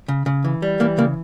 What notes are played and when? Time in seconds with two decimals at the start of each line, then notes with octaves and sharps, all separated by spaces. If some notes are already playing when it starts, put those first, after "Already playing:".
0.08 C#3
0.26 C#3
0.44 E3
0.62 G3
0.80 E3 A#3
0.98 C#3 A#3